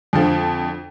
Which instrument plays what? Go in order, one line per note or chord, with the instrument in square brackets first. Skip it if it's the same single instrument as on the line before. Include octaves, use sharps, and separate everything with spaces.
[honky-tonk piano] F2 D3 F3